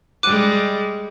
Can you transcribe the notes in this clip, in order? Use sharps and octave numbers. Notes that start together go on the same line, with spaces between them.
G3 G#3 D6 F#6 D#7